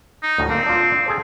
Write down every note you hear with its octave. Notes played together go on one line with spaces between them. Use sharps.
D#4
D2 A2
A#3 C4
D4 F4
G#4 A4 C5